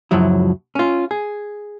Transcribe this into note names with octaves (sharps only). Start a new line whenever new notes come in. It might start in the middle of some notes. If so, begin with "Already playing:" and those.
C#2 F#2 F3 F#3 E4
C#4 F4
G#4